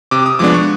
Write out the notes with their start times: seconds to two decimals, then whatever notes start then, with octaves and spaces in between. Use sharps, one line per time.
0.11 C3 D6
0.26 D#6
0.39 F3 G#3 B3 D4 D6
0.54 C#6